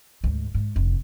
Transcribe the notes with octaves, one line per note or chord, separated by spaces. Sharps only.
D2 G#2
G#2
F1 D3